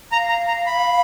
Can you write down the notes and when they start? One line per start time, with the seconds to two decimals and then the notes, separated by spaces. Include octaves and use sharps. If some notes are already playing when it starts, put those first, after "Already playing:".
0.12 F5 A#5
0.29 A#5
0.47 A#5
0.66 B5